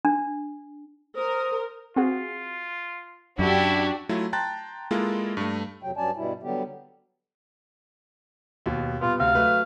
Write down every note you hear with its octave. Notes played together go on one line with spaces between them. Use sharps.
D4
A#4 C5 D#6
C4 F4 F#4 G#4
F#2 D4 E4 F#4 G4
F#3 A3 E4 F4
G5 A5 A#5 C6 F#6 A6
G#3 A#3 E4 F4 G#4 A4
G2 A3
F2 C3 F#3 G5
G2 F#3 C#4 D5 G#5 A5
G2 B2 G3 E4
D3 F#3 G3 B3 G4
D#2 B2
A#2 G3 B3 F4
D2 C3 F5
F#3 A3 B4